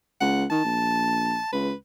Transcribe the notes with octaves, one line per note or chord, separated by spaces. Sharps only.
C#2 F#5
D#3 A5
A#1
C#2 B4